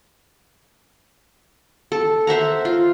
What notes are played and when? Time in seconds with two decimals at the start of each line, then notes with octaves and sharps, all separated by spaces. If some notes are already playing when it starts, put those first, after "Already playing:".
1.92 A4
2.27 C5 E5 F#5 A#5
2.65 F4